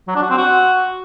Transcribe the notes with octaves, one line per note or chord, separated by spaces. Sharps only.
F#3
D4
F#4
C4
F#4